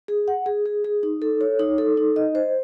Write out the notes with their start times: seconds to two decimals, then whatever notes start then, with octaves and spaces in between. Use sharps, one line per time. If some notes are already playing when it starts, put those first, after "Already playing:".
0.08 G#4
0.28 F#5
0.46 G#4
0.66 G#4
0.84 G#4
1.03 D#4
1.22 A4
1.41 C#5
1.59 D#4
1.78 A4
1.97 D#4
2.16 D#5
2.35 C5